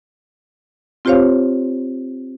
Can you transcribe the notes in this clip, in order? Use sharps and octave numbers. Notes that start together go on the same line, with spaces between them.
C4 F4 G4 C5 C#5 F5